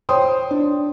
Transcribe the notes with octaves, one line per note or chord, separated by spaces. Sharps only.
C5 C#5 G5 C6 D#6
D4